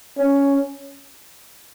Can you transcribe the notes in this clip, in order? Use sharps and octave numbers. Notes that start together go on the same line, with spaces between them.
C#4